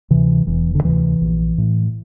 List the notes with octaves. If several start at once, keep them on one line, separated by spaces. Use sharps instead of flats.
D2 C3 E3
E1 E3
D3
D2 C3 E3
A#1
A2